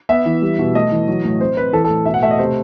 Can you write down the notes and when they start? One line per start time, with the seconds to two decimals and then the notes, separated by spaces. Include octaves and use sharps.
0.09 B3 E5
0.25 E3
0.42 G3
0.59 B2
0.75 A3 D#5
0.91 E3
1.08 F#3
1.24 A2
1.40 C4 C5
1.57 C4 B4
1.73 E3 A4
1.85 A4
1.89 A2
2.06 B2 E5
2.14 F#5
2.22 A3 E5
2.31 D#5
2.39 C3 C5